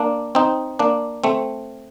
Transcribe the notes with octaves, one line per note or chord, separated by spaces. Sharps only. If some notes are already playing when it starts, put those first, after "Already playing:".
Already playing: A#3 D4
C4 D#4
A#3 D4
A3 C4